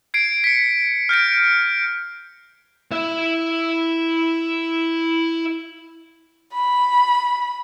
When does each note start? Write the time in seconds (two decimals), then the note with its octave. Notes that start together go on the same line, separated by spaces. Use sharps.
0.14 G#6 C7 D7
0.44 B6 C#7
1.09 F6 G6 A#6 D7
2.91 E4 E5
6.54 B5